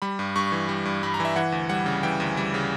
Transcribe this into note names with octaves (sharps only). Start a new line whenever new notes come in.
G3 B5
G2
G2 C#6
E3
G3
G2
G2 B5
A#5
E3 E5
E3 F#5
D2
G3 F#5
C#3
E3 G5
D2
G3
C#3